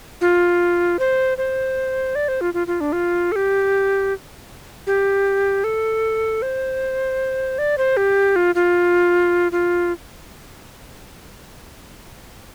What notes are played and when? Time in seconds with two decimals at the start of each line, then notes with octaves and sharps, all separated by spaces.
0.21 F4
0.99 C5
1.38 C5
2.15 D5
2.28 C5
2.41 F4
2.54 F4
2.67 F4
2.81 D4
2.93 F4
3.32 A4
3.36 G4
4.87 G4
5.64 A4
6.42 C5
7.58 D5
7.78 C5
7.97 G4
8.36 F4
8.55 F4
9.52 F4